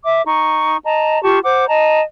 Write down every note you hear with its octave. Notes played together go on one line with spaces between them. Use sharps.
E5 D6
D#4 C#6
D#5 A5 A#5
F4 G4 A5 C#6
C5 F#5 D6
D#5 A5 A#5